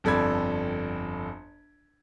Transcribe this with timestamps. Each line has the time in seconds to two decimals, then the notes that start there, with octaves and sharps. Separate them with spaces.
0.04 G1 F2 A4 D5 B5 G#6